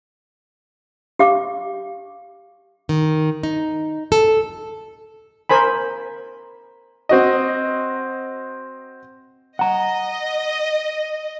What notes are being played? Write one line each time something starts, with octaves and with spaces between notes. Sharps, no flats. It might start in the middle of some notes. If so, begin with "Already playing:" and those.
G4 F5 D6
D#3
D#4
A4
A#4 C5 G#5 B5
C4 F#4 D#5
D#5 F#5 A#5